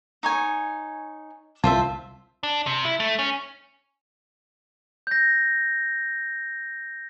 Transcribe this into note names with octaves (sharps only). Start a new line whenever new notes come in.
D#4 C#5 G#5
C2 F4 C5 E5 A5
D4
C3
E4
A3
C#4
G6 A#6